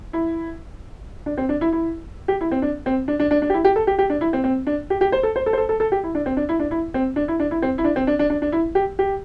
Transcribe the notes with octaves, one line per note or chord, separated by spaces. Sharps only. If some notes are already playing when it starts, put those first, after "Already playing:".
E4
D4
C4
D4
E4
E4
G4
E4
C4
D4
C4
D4
D4
D4
D4
G4
E4
G4
A4
G4
G4
D4
E4
C4
C4
D4
G4
G4
C5
A4
C5
A4
C5
A4
A4
A4
G4
E4
D4
C4
D4
E4
D4
E4
C4
D4
E4
D4
E4
C4
E4
D4
C4
D4
D4
D4
D4
E4
G4
G4